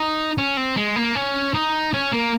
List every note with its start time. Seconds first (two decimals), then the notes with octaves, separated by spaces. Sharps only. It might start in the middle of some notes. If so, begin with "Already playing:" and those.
Already playing: D#4
0.38 C#4
0.57 C4
0.76 G#3
0.96 A#3
1.15 C#4
1.54 D#4
1.93 C#4
2.13 A#3